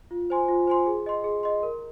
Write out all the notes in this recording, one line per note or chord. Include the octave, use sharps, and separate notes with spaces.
F4
C5 G#5 C6
F4
C5 G#5 C6
G#4
D#5 C6
G#4
D#5 C6
A#4